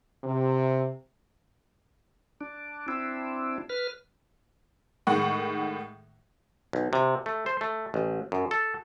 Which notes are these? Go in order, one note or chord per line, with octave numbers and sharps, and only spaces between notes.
C3
D4
C4 D4 E4
B4 F6
A2 D#3 G#3 F#5 C#6
B1
C3
A3
C5
A3
A1
F#2
A4